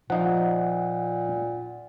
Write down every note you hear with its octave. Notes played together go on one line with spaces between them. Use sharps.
A#2 F3 D#4 F#5